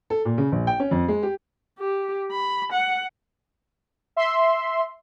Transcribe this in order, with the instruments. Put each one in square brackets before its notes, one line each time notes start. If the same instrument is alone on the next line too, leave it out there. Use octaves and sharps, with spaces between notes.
[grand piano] A4
A#2
C#3
A#1
G5
C#4
F2
G#3
G4
[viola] G4
B5
F#5
[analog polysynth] E5 C6